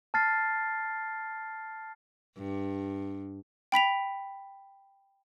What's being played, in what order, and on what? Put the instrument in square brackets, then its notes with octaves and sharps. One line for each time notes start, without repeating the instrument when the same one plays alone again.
[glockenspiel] A5 F6 A6 C7
[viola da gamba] G2
[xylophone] G5 B5 B6 F7